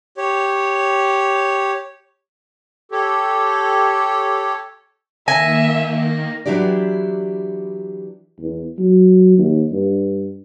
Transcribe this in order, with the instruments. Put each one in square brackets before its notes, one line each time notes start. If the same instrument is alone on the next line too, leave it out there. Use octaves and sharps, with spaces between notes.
[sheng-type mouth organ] G4 C#5
[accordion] G4 A4 C#5
[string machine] D#3 A#3 [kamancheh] E5 [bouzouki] G#5 [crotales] A#6
[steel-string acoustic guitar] E3 F#3 D4 E4 G4 D5
[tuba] E2
F#3
D#2
G2